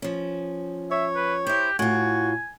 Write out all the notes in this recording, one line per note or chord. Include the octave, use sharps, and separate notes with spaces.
F3 C#4
C#5 E5
B4
E4 G4 C5
A2 F4 F#4 G#5